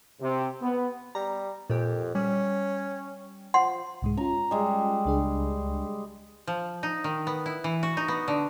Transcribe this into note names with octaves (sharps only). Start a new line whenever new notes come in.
C3
B3
G3 A#5
F2 A#2 G4
G3 C#4
F3 F#5 C6
C2 G#2 G#3
C#4 F4 A#5
G3 G#3
C#2 D4 G#4
F3
D#4
D#3
B3
E4
E3
F#4
D#4
B3
D3